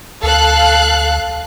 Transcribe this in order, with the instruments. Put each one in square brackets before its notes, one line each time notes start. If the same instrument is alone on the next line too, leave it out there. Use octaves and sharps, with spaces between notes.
[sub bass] D2 [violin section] A4 F5 F#6